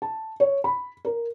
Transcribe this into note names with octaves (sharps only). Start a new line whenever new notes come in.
A5
C#5
B5
A#4